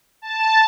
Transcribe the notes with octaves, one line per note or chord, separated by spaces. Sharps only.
A5